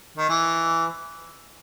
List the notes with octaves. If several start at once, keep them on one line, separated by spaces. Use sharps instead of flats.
D#3
E3